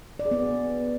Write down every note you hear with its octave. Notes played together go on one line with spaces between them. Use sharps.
D5
G#4
B3